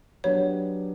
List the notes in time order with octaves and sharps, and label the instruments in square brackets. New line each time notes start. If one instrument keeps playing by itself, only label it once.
[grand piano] F#3 B3 D4 G4 B4 [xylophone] C#5